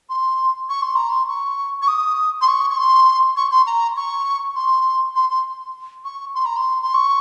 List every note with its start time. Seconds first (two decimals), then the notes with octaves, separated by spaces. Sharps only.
0.09 C6
0.70 C#6
0.82 C6
0.96 A#5
1.10 C6
1.28 C#6
1.82 C#6
1.88 D#6
2.41 C6
2.48 C#6
2.70 C#6
2.77 C6
3.37 C#6
3.52 C6
3.67 A#5
3.97 C#6
4.56 C6
5.15 C6
5.30 C6
6.05 C#6
6.35 C6
6.45 A#5
6.57 C6
6.82 C6
6.94 C#6